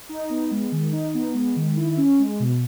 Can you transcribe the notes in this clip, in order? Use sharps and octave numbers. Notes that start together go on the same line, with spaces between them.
D#4
B3
G#3
D#3
D#4
B3
G#3
D#3
E4
C#4
G#3
B2